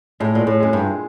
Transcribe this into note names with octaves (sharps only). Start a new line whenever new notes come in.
A2 G#3
A#2
G#3
A2
F#2 G#3
G2
A#2